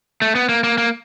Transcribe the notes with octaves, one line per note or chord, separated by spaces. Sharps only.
A3
B3
A#3
A#3
A#3